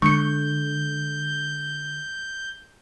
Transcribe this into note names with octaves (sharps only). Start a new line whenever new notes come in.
D3 G#3 C#6 G6 C#7